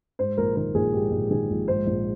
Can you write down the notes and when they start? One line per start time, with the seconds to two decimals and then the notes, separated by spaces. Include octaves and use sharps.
0.19 G#2 C5
0.37 A#1 A#4
0.56 D#3 A#4
0.75 A#1 G#4
0.93 G#2 G4
1.12 A#1
1.31 D#3 G#4
1.50 A#1
1.68 G#2 C5
1.87 A#1